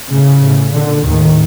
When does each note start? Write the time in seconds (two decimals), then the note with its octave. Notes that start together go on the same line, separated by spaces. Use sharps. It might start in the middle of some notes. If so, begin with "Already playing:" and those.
0.12 A2 C#3
0.44 A2
0.74 A#2 D3
1.05 D#2 A2 D#3